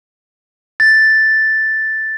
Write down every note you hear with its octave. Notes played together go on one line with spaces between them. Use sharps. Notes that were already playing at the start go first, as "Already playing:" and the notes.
A6